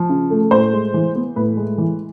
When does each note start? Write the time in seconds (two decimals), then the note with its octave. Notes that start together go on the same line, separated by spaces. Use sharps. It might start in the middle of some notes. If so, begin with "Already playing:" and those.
Already playing: F3
0.09 C#3
0.30 A3
0.51 A2 C5
0.73 G#3
0.94 E3
1.15 B3
1.36 A2 B4
1.57 G#3
1.78 E3